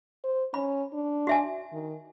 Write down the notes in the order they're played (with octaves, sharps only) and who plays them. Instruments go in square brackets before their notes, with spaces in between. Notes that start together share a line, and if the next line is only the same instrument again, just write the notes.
[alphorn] C5
[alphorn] C#4 [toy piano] B5
[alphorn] D4
[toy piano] F#4 E5 G#5
[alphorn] D#3